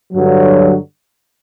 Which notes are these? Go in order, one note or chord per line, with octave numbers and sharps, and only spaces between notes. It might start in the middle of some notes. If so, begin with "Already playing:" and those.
G2 D3 F#3